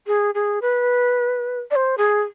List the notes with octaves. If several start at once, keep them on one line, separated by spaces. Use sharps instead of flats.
G#4
G#4
B4
D5
C5
G#4